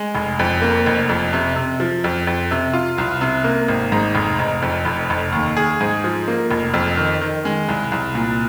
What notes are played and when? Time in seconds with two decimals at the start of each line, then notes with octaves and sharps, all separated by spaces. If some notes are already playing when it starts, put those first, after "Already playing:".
Already playing: G#3
0.15 F1
0.39 F2
0.62 A#3
0.86 F1
1.09 F2
1.33 C3
1.56 C3
1.80 F3
2.04 F2
2.27 F2
2.51 C3
2.74 F4
2.98 C2
3.21 C3
3.44 A#3
3.68 G#1
3.92 G#2
4.15 F1
4.39 F1
4.62 F2
4.85 F1
5.10 F1
5.32 D#2
5.57 G#4
5.81 G#2
6.04 F3
6.28 A#3
6.51 F1
6.74 F2
6.97 D#3
7.21 D#3
7.45 G#3
7.68 C2
7.92 C2
8.15 A#2